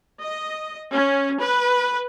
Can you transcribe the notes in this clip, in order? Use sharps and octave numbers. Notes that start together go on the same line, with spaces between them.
D#5
C#4
B4